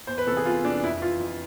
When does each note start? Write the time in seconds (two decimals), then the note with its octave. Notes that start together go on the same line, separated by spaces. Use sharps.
0.07 E2 C5
0.18 B4
0.27 C3 E3 A4
0.37 G#4
0.45 E2 F4
0.64 C3 E3 D4
0.83 F2 E4
1.01 E3 F4
1.21 F2